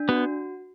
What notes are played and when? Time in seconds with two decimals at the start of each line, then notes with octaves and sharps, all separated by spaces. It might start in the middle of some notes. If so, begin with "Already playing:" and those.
Already playing: D4
0.09 B3 F#4